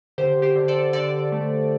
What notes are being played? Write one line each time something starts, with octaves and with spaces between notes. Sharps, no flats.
D3 G4 C5
G4 C5
D3
A4 D5
D3 A4 D5
A3